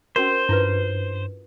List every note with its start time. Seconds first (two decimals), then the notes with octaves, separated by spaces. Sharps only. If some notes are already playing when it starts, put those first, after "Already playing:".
0.16 C#4 F#4 A#4 C5
0.49 G2 E4 F4 B4